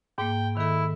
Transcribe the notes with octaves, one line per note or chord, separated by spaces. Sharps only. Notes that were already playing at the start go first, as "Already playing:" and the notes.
G#2 A#3 G5
D#3 E4 A4